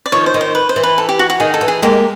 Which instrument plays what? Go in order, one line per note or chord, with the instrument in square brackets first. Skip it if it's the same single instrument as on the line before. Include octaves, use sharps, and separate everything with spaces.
[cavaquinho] D5
[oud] D#3 F3 [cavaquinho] C#5
[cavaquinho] C5
[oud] D#3
[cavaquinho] C5
B4
C5
[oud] E3
[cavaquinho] B4
A4
G4
F#4
F#4
[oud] D#3 [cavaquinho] G#4
[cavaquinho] A4
[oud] E3
[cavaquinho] G#4
[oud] G#3 A#3 [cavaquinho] G4